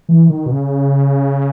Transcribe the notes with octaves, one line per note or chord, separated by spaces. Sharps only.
E3
D#3
B2
C#3